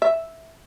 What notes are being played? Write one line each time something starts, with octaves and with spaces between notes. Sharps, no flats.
E5